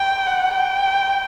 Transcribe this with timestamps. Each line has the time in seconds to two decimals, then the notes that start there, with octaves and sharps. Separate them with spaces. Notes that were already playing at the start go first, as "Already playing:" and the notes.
Already playing: G5
0.26 F#5
0.54 G5